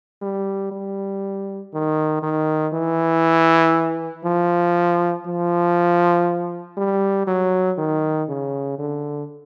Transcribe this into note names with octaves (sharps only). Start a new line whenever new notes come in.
G3
G3
D#3
D#3
E3
F3
F3
G3
F#3
D#3
C#3
D3